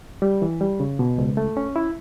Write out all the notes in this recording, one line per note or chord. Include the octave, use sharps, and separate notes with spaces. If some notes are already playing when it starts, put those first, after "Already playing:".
G3
E3
G3
C#3
B2
C#2
A3
C#4
E4